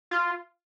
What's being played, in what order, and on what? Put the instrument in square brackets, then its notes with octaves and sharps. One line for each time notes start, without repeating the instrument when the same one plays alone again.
[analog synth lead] F4